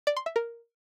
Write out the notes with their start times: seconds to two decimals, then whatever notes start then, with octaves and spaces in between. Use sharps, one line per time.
0.07 D5
0.17 C6
0.26 E5
0.36 A#4